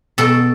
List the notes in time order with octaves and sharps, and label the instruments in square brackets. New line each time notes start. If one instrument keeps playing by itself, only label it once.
[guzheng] B2 A4